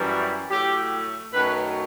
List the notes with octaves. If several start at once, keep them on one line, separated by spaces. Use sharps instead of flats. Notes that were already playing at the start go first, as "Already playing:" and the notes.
Already playing: F#2 E3 G3
A2 F#3 A3 G4
F#2 D#3 F#3 A3 B4